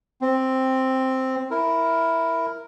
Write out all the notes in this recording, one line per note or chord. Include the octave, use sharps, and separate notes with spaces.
C4
E4 A#4